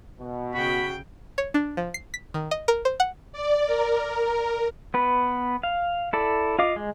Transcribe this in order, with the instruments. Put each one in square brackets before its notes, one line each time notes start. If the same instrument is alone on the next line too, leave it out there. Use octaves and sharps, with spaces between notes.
[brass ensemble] B2
[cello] C#3 G5 [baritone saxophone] F#4 [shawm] B5
[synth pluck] C#5
D4
F3
C7
B6
D#3
D#5
A#4
C5
F#5
[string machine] D5
A#4
[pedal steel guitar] B3 B4
F5
E4 A4 D5
F4 D#5 F5 D6
G#3